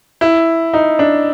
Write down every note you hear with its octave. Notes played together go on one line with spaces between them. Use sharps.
E4
D#4
D4